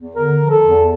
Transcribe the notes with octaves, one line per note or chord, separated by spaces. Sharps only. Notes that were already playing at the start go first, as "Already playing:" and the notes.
Already playing: E2
D3 A#4
F3
A4
E2